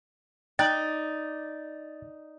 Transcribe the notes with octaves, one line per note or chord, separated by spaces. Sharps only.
D#4 D5 G5 F#6 A6